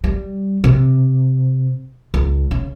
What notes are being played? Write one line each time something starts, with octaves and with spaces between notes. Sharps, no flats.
G3
C3
C#2
C#3